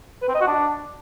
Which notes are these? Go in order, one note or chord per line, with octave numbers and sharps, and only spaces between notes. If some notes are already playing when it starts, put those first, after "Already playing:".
B4
C4
D#5
F#4
D4